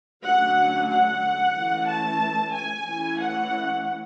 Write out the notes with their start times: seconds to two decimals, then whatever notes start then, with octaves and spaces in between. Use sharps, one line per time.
0.23 D3 F#3 A3 C#4 F#5
0.89 F#5
1.55 E3 A3 C#4
1.88 A5
2.53 G#5
2.87 E3 A3 C#4
3.20 F#5